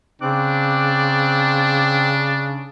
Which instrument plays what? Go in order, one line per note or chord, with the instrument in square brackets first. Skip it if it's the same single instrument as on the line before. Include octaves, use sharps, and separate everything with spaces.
[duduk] C#3 [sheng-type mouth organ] C4 D6 F#6 [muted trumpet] D4